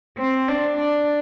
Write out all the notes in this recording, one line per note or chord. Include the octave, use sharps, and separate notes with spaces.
C4
D4
D4